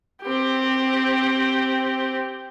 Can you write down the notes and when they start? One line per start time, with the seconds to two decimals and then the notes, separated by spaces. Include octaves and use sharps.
0.23 C4 G4